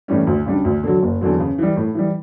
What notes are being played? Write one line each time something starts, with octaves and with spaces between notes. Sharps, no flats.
A2 E3 G3 C#4
D2
C#3 G3 D4
D2
D3 F#3
F#1
E2 D3 F#3
C#3
E3 G3
A2
E3 G3